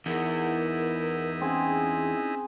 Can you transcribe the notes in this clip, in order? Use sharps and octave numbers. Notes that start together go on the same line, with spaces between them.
E2 D#4 E4 A#4
C4 C#4 G#4